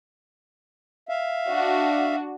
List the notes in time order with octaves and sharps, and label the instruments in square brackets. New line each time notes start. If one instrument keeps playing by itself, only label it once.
[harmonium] E5 F5
[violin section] D4 F#4